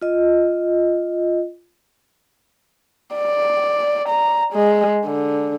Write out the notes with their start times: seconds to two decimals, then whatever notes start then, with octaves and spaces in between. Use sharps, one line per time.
0.02 F4 D#5
3.15 D5
4.09 A#5
4.54 G#3
5.06 D3